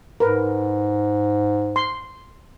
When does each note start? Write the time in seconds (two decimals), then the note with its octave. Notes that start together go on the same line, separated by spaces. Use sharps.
0.20 G#2 A#4 B4
1.76 C6